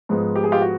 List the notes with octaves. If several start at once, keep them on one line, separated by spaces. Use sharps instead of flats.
G#2 F3 G#3 B3
G4
G#4
F4 G4
F#4